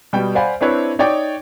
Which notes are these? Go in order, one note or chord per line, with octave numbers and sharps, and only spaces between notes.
B2 G3 B3 G5 G6
C5 D5 F5 F#5 G#5 B5
C4 D4 E4 B4 C#5
D#4 C#5 D5 G5 D6